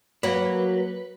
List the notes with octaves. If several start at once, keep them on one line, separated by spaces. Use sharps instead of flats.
F#3 A#3 B4